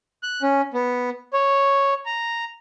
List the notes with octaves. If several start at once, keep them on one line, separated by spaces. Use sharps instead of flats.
F#6
C#4
B3
C#5
A#5